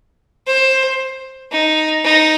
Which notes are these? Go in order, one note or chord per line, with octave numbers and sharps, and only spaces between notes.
C5
D#4
D#4